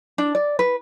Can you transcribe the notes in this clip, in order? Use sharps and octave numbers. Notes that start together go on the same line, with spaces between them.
D4
D5
B4